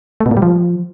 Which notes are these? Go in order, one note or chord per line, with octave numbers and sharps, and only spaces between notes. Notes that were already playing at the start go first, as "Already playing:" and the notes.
A3
B2
A#2
G3
F3